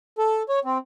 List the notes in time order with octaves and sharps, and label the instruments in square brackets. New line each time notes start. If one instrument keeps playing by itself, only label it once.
[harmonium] A4
C#5
C4